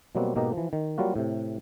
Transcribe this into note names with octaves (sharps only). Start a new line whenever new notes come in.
B2 F#3 G3 A#3 C4 F#4
G#2 B2 A#3 G4 D#5 A#5
E3 F3
D#3
F#3 G3 A#3 F4 F#4
A2 C3